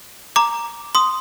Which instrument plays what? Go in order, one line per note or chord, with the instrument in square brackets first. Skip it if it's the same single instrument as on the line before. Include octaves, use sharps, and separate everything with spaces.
[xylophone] A#5 D6
C6 D#6